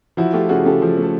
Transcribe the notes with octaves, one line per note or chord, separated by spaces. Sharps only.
F3 E4 F#4
A3 F4 G4
C#3 F#4 G#4
C#3 G4 A4
F3
A3
A4